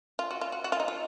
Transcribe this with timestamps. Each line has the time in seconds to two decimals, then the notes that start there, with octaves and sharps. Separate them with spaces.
0.19 F4
0.31 F#4
0.41 F4
0.52 F#4
0.64 F#4
0.72 F4
0.80 D#4
0.88 F4